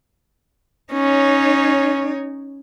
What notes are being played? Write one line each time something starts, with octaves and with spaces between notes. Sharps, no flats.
C#4 D#4 C#5